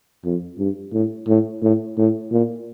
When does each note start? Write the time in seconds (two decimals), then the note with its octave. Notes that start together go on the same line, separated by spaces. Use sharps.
0.25 F2
0.59 G2
0.93 A2
1.28 A2
1.62 A2
1.98 A2
2.32 A#2